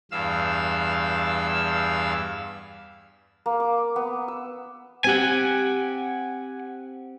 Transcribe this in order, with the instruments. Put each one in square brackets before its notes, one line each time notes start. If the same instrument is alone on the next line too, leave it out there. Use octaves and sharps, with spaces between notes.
[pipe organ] E2 G2 F5 E6
[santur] A#3
D6
B3
E6
[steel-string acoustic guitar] C4 G4 [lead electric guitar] F#5 G#5